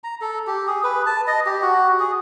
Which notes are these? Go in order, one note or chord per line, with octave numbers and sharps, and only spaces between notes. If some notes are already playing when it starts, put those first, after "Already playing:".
A#5
A4
G4
G#4
B4
A5
D#5
G4
F#4
G#4